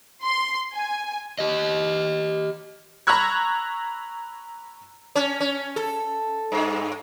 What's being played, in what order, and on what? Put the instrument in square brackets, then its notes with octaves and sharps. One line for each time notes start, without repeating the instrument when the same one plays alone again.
[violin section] C6
G#5
[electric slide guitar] G4 D#5
[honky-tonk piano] A#5 B5 C#6 E6 F#6 G#6
[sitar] C#4
C#4
A4
G2